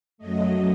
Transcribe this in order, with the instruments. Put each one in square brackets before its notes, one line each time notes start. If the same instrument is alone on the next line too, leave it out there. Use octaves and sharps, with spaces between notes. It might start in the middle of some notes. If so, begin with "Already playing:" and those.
[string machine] F#2 F#3 A3 D#5